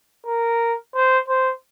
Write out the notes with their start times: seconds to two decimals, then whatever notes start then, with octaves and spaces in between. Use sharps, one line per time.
0.26 A#4
0.95 C5
1.28 C5